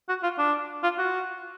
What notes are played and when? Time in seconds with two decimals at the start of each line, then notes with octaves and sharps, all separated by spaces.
0.09 F#4
0.23 F4
0.38 D4
0.83 F4
0.98 F#4